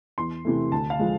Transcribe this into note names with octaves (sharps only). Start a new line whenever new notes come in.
E2 C6
C3 E3 A3
D2 A5
F5
F3 G#3